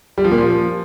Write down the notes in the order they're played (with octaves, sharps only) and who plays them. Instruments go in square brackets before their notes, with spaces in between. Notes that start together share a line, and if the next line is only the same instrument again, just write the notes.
[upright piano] G3
F3
A#2
F3